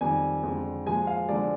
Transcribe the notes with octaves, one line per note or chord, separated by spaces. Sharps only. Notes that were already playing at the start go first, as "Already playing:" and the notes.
F2 D#3 G3 G#5
F2 D3 G#3
A#2 F3 G#3 G#5
F5
D3 F3 G#3 D5